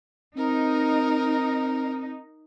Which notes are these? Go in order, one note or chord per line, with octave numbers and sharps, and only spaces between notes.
C4 D#4 A#4